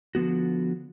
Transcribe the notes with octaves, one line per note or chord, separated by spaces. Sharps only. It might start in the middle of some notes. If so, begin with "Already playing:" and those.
D3 F3 B3 F#4